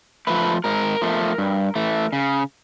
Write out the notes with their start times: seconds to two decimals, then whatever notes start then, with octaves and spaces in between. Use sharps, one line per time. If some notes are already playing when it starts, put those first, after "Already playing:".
0.27 F3 A3 B4
0.64 G#2 A#4
1.01 F3 A3
1.38 G2
1.76 E3 A3
2.13 C#3